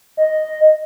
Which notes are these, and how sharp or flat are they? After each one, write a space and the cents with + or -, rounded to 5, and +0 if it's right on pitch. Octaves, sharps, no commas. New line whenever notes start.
D#5 -5